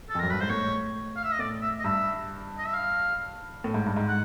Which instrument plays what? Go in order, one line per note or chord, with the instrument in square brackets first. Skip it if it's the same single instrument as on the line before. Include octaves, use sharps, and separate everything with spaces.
[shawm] A4
[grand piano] F2
[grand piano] F#2 [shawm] A#4
[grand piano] G2 [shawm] B4
[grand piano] G#2 [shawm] C5
[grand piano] A2 [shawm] C#5
[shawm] F5
E5
D#5
[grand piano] A2 [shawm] D5
[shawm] E5
D#5
[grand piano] G2 [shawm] E5
[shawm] D#5
E5
F5
[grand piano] A2
G#2
G2
G#2
[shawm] F#5